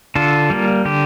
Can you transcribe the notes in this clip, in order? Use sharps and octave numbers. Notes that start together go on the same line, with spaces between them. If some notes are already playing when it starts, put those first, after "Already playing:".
D3 F4 A4
G3 A#3
D3 G4